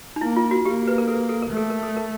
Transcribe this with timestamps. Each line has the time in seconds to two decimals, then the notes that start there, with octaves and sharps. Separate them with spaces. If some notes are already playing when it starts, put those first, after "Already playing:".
0.16 D#4
0.21 A#3 E4
0.36 F4
0.51 F#4
0.65 A#3 G4
0.88 B4
0.98 A#4
1.08 A4
1.29 A4
1.42 A#4
1.51 A3
1.57 A4
1.70 A#4
1.83 A4
1.97 A#4